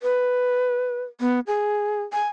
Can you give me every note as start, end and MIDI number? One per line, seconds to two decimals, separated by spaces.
0.03 1.02 71
1.20 1.40 59
1.47 2.03 68
2.13 2.28 80